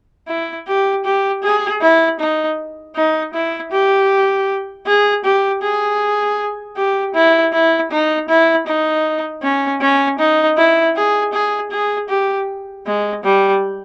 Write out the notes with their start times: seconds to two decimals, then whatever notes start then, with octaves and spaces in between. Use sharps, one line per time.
0.28 E4
0.67 G4
1.05 G4
1.43 G#4
1.81 E4
2.20 D#4
2.96 D#4
3.34 E4
3.72 G4
4.86 G#4
5.24 G4
5.62 G#4
6.77 G4
7.14 E4
7.53 E4
7.91 D#4
8.29 E4
8.67 D#4
9.43 C#4
9.81 C#4
10.19 D#4
10.57 E4
10.96 G#4
11.33 G#4
11.71 G#4
12.09 G4
12.86 G#3
13.24 G3